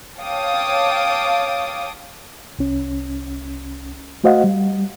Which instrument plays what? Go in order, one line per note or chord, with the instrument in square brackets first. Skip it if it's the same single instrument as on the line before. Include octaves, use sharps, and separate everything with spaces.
[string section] C#5 F5 G5 A5 D6 D#6
[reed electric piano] C2 C#4
A3 F#4 C5 D#5 F5 F#5
G3